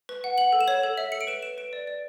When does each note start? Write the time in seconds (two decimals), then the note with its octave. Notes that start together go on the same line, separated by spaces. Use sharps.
0.09 B4
0.24 F#5
0.38 F#5 F#7
0.53 A4
0.61 E7
0.68 C#5
0.83 A4
0.98 E5
1.12 A4 C#7
1.21 D7
1.27 B4 E7
1.43 B4 E7
1.58 B4 D7
1.73 D5
1.87 D5